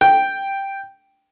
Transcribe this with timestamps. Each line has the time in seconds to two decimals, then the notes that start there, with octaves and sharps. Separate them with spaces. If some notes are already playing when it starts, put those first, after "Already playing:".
0.01 G5